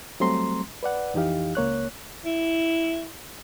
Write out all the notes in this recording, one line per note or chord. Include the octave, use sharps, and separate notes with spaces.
F#3 G3 A3 C4 A#5 C6
B4 D5 F#5
F2 E3 D#4 G4 F5
C#2 A#3 C#5 F#6
E4